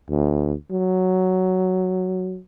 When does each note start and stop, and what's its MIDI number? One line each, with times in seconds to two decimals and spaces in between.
0.10 0.54 38
0.71 2.39 54